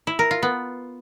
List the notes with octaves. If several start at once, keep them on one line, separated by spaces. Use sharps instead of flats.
E4
A#4
F4
B3